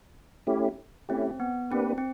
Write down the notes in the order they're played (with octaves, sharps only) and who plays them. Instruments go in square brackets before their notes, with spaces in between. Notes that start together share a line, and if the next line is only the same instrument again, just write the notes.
[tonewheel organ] A3 C#4 E4 G4
[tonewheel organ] A3 C#4 E4 G4 [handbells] C4
[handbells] B3
[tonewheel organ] A#3 D4 G4 B4 [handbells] C4
[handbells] C4